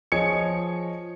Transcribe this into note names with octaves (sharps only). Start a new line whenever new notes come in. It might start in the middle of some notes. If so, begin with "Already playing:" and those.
F3 G#4 C#5 D#5 G#6 C#7